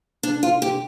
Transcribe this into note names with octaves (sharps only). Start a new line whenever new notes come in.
D4
F4
G4